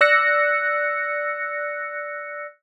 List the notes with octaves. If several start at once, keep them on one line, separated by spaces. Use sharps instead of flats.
D5 E6 F#6 A#6 C#7